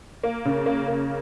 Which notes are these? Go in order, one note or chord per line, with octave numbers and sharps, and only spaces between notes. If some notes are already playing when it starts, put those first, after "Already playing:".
A#3
C#3
A#3
A#3